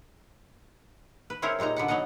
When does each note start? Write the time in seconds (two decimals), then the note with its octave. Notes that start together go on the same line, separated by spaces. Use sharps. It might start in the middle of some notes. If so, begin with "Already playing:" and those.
1.30 B4
1.42 C4 C#4 E4 G#4 A#4 C#5
1.59 A#2 G3 G#3 D#4 A#5
1.76 D3 B3 F#5
1.88 F#3 B3 D#4 D#5 F#5